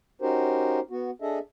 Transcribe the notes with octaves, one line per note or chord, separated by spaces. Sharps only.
C#4 D#4 F#4 G4 A#4 C5
B3 F#4
D4 G#4 A4 D#5 E5